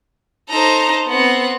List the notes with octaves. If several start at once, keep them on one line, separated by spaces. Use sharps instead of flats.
D#4 A4 C5 A#5
B3 C4 F#5